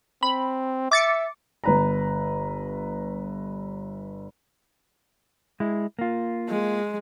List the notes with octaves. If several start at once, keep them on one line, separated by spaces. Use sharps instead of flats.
C4 B5
E5 D6 A6 C#7
G1 B4 A#5
G#3 E4
A#3 F4
G#3